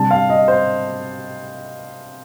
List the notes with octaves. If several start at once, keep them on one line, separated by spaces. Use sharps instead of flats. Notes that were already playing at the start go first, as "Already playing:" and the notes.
Already playing: C3 G3 D4 A5
F5
D#5
C5